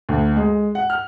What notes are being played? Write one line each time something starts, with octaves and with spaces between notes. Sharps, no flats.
D2
G#3
F#5
F6